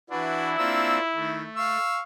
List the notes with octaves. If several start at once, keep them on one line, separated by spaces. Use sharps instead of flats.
E3 D4 E4 F#4 B4
A#3 C4 D4 F4 E6
D#3 A3
F5 C#6 E6